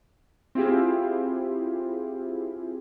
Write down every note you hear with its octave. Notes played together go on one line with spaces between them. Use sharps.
C4 E4 F4 G4 G#4